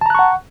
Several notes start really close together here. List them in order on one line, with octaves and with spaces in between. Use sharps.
A5 A#5 F#6 C#6 F#5